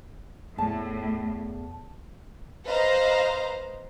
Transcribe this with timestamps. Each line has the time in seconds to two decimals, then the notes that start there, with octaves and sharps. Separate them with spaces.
0.58 E2 A2 A5
2.65 B4 C5 D#5 F5 A#5